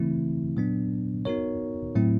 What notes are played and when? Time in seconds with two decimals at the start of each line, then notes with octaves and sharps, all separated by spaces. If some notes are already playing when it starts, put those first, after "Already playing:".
Already playing: C#3 E3 A3 C4 E4
0.56 A#2 F#3 B3 D4
1.25 B3 D#4 F#4 A#4 C#5
1.95 A2 F#3 A3 C4 E4